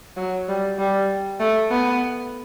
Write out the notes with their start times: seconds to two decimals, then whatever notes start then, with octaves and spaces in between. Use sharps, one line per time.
0.16 F#3
0.48 G3
0.79 G3
1.40 A3
1.71 B3